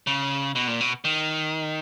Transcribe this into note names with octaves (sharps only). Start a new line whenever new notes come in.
C#3
B2
A#2
B2
D#3